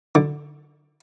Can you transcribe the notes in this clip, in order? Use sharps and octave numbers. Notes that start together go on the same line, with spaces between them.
D3